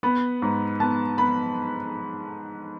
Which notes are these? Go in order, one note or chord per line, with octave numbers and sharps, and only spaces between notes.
B3 B5
G#2
B3 A5
B3 B5